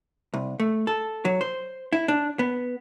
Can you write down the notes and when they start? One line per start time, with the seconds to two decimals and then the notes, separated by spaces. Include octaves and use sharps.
0.34 C2
0.60 A3
0.87 A4
1.25 F#3
1.41 C5
1.93 E4
2.08 D4
2.39 B3